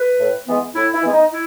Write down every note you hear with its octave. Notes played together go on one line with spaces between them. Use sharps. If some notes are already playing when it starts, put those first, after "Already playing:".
Already playing: B4
A2
E3 G#3 B3
A2 E4
E4
E3 G#3 B3
D#4
E4